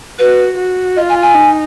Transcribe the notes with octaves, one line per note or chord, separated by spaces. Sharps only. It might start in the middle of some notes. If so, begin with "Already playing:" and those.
F#4 B4
F#4
F4 D#5
G#5
G#5
D#4